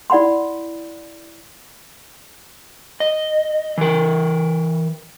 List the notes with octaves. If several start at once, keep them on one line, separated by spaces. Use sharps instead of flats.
E4 D5 F#5 B5 C6
D#5
E3 A#4